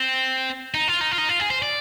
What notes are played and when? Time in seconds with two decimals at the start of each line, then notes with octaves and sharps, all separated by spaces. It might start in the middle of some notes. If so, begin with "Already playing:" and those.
Already playing: C4
0.74 D#4
0.88 F4
1.01 D#4
1.11 F4
1.18 D#4
1.29 F4
1.40 G#4
1.50 C5
1.62 D5